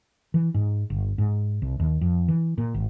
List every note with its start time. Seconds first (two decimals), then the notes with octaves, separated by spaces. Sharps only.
0.34 E3
0.54 G#2
0.90 G1
1.18 G#2
1.62 C2
1.80 D#2
2.01 F2
2.28 E3
2.58 A#2
2.74 G#1